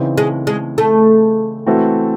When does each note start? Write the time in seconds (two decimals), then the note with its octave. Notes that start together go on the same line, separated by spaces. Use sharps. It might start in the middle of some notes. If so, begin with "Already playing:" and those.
Already playing: C#3 E3 C4 D#4
0.18 G#3
0.47 G#3
0.78 A3
1.66 E3 A3 C4 F#4 A4